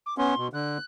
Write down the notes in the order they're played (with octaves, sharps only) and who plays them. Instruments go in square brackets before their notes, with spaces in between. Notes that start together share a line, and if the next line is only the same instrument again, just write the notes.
[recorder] D6
[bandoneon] B3 C#4 [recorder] C6
[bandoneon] B2
[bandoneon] D3 [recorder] F#6